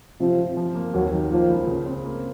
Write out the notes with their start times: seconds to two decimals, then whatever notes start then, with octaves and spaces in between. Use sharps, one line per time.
0.20 C3 F3
0.39 C3
0.57 F3
0.75 A#3
0.94 D#2 F#3
1.12 D#3
1.31 F3 A#3
1.49 C#2
1.67 C#3
1.86 C4
2.05 A#3